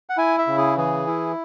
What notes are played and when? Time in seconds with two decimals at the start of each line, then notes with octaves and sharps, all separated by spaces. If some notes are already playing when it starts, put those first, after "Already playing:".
0.09 F#5
0.17 E4 G#5
0.38 E5
0.47 C#3
0.58 G#4
0.77 E3 G#4
1.07 E4